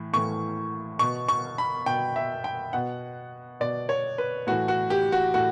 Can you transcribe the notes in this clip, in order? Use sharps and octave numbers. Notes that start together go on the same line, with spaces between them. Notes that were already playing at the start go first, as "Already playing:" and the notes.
Already playing: A2 E3
A2 E3 C#6
B2 C#6
C#6
B5
B2 G5
E5
G5
B2 F#5
B2 D5
C#5
B4
A2 E3 F#4
F#4
G4
F#4
A2 F#4